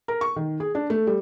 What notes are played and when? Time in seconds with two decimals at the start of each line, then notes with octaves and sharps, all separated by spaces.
0.08 A#4
0.21 C#6
0.36 D#3
0.60 G#4
0.75 D4
0.90 A3
1.07 G3